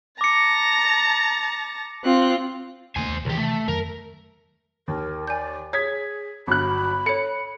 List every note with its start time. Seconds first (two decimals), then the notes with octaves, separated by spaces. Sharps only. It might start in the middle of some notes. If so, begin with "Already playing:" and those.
0.21 A5 A#5 D6 C#7
2.04 C4 F4 F#6
2.96 D#2 C#3 A#3 C5 G#5
3.09 D#2
3.25 C#2 C3 D#3 E3 G4
3.38 A3
3.68 F2 D#3 F#3 A#4
4.88 D#2 A#4
5.27 D5 G#5 G6
5.73 G#4 C#5 D#6 G#6 B6
6.47 G1 F#3 B5 F#6
7.06 A4 C#5 C#7